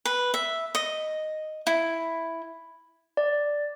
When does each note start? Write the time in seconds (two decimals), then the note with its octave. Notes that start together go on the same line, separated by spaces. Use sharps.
0.05 B4
0.34 E5
0.75 D#5
1.67 E4
3.17 D5